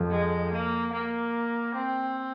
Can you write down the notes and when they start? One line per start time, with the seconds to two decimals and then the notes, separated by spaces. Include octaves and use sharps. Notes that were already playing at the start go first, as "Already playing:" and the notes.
Already playing: F2
0.11 G#3
0.52 A#3
0.93 A#3
1.75 C4